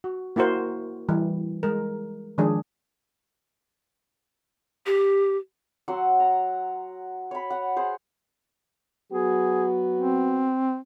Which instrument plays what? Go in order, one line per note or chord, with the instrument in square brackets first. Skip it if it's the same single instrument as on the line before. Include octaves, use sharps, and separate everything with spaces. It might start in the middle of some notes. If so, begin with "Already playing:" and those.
[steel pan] F#4
A#3 E4 F#4 A#4 C5
E3 G3
G#3 A#4
D#3 F3 G#3 D4 G#4
[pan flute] G4
[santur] F#3 F#5 C6 E6
A#5
C#5 B5
F#5
G#4 C5
[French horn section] F#3 B3 F#4 [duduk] G#4
[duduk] C4